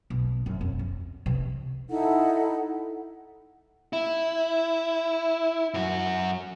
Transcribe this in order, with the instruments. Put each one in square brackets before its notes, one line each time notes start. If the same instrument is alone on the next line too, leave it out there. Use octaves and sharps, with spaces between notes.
[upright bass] B1
F#2
F2
C#4
C3 E3
[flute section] D#4 E4 A4 F#5
[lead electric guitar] E4
F#2 F#4